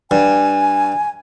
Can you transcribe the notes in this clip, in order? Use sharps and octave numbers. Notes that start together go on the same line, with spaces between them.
G2 G#5